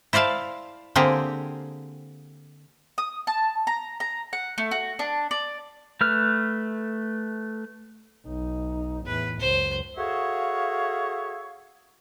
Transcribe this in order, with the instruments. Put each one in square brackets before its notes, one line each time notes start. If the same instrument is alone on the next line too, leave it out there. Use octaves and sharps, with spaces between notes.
[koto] E4 C5 D5 F5 A5
D3 A#3 C4 G4 G#4
[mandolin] D#6
A5
A#5
A#5
F#5
A3
F#4
D4
D5
[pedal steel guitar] A3 B4 F6
[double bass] B1 D#4
[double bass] E2 A2 [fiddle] B4
[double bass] C#2 F#2 [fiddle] C5
[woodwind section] F#4 G#4 A4 C#5 E5 F5